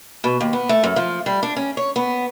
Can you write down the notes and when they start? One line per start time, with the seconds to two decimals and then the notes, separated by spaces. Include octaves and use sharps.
0.24 B2
0.41 D#2
0.53 B3
0.69 A3
0.83 F#2
0.96 F3
1.26 G3
1.43 D4
1.56 C#4
1.77 C#5
1.96 B3